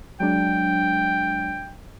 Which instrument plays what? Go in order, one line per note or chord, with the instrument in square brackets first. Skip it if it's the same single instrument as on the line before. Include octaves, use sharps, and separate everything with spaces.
[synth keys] F#3 G#3 D4 [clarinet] G5